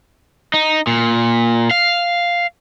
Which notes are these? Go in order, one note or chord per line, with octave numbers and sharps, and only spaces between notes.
D#4
A#2
F5